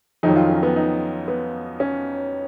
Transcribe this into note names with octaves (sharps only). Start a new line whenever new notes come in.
F2 D#3 F#3 D#4
F4
C#4
B3
D#4
B3
C#4